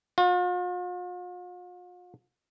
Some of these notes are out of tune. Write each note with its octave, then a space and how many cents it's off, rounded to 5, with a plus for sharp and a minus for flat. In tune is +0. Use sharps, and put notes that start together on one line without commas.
F4 +45